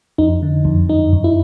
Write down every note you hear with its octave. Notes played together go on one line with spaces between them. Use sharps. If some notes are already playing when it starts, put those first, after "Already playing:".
F2 D#4
D3
F2
F#2 D#4
F#2
E4